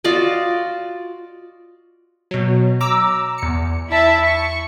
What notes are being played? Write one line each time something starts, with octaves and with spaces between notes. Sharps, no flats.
F4 F#4 D5 D#5
B2 F#3
A#5 D6 E6
E2 C#7
E4 E5 A5
C#6